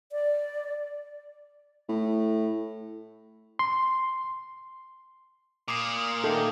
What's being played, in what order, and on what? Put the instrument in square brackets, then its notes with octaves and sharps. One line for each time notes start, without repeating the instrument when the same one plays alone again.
[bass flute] D5
[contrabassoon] A2
[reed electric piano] C6
[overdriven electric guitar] A#2 [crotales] D6 D#6 C7
[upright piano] D#3 A#3 [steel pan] A4